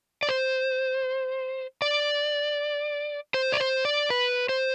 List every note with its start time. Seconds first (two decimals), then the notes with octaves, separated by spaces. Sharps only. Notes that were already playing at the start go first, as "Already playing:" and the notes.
0.23 D5
0.29 C5
1.82 D5
3.34 C5
3.52 D5
3.60 C5
3.85 D5
4.10 B4
4.49 C5